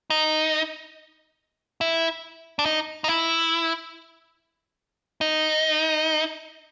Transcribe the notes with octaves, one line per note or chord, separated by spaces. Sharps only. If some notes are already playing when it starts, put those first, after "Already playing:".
D#4
E4
D4
D#4
D#4
E4
D#4